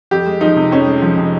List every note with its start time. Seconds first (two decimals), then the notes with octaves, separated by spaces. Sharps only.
0.11 F2 G4
0.26 G#3
0.41 F3 D#4
0.56 C3
0.71 F2 C#4
0.87 G#3
1.02 F3
1.17 C3